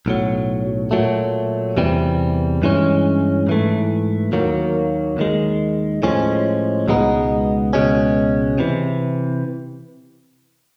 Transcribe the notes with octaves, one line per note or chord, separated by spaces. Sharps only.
B1 A2 F#3
A#2 F#3 A3
E2 C3 E3 G3
G2 E3 G#3 C#4
G#2 E3 A3
D#2 D#3 F#3 A#3
D#2 D#3 G#3
A2 F3 G#3 C#4
C#2 B2 G#3 B3 D#4
C#2 B2 G#3 C#4
C3 E3